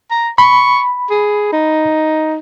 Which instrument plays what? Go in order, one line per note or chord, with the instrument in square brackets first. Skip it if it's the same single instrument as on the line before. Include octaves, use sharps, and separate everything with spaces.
[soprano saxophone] A#5
[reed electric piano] B5 [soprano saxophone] C#6
[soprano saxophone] G#4
D#4